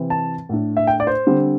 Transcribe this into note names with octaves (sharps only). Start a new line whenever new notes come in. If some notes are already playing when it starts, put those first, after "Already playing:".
Already playing: C3 E3 C4
A5
A2 A3 D4
E5
G5
D5
C5
D3 G3 C4